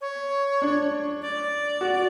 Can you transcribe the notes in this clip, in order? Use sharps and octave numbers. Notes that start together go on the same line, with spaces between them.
C#5
D4
D5
F#4